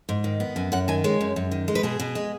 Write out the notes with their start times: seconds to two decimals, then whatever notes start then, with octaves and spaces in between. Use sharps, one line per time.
0.09 G#2
0.24 D#3
0.40 B3
0.56 F#2 G#5
0.72 F#2 F#5
0.88 D#3 G#5
1.04 G#3 C#5
1.21 F#2
1.36 F#2
1.51 D#3
1.68 G#3
1.75 B4
1.83 B2 G#4
2.00 B2
2.15 G#3